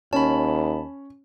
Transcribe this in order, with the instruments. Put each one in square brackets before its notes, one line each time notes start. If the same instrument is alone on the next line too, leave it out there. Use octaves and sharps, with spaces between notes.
[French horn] D#2 [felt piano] C#4 [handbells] A5 B5